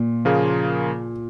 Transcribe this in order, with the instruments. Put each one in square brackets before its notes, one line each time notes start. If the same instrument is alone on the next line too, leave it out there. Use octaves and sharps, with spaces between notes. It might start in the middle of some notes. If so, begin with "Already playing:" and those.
Already playing: [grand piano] A#2
[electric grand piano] C#3 F3 A#3 F4 G#4